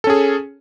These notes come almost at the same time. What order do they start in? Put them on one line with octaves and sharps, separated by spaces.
A4 C#4 G#4